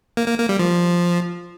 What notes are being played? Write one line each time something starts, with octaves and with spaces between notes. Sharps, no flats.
A#3
A#3
A#3
G3
F3